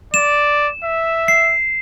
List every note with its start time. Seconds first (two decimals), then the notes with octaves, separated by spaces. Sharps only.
0.14 D5 E7
0.84 E5
1.28 C7